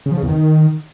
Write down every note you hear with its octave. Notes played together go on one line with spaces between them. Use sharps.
C#3
F3
C#3
E2
D#3